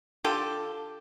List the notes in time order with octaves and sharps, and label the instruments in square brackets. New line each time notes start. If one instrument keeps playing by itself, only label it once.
[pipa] D3 F4 G4 A4